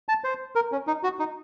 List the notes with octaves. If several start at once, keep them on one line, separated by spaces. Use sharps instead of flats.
A5
C5
A#4
C#4
D#4
F#4
D#4